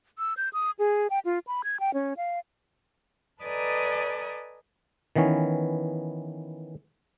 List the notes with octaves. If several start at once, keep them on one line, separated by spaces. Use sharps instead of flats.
E6
G6
D#6
G#4
G5
F4
B5
G#6
G5
C#4
F5
A4 B4 D5 D#5 G#5 A#5
D#3 E3 B3 C#4